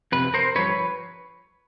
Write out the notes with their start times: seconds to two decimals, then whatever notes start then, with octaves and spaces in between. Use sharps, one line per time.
0.12 F2 C3 B4
0.34 A#4 C5
0.55 G2 D3 F3 B4 C#5